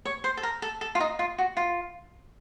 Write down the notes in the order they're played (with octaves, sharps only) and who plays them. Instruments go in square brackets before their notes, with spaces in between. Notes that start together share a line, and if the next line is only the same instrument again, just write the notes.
[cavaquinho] C#5
C5
A4
A#4
A4
A4
F4
D#4
F4
F#4
F4